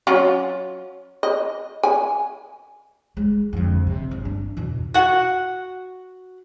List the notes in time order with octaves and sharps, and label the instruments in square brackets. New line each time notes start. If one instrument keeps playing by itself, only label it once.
[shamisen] F#3 C#4 F4
D#5
G#5
[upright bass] G#3
F2 D3
C3
G1
D4
E2 B2
[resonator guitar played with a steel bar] F#4 F#5